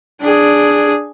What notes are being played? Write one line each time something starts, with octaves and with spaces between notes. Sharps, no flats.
D4 G#4